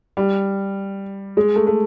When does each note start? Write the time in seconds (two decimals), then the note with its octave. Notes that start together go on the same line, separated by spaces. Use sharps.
0.17 G3
1.37 G#3
1.56 A3
1.67 A3